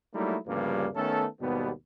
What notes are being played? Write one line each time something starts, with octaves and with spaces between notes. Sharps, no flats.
F#3 G3 A3 A#3 D#4 E4
D2 G2 C#3 F3 G3 A#3
D#3 A3 B3 C#4 A4
D#2 G#2 B2 G3 B3